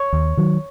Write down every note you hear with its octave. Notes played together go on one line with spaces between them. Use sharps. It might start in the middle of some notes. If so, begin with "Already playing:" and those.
Already playing: C#5
D#2
D#3 F#3